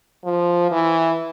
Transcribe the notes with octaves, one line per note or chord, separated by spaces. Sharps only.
F3
E3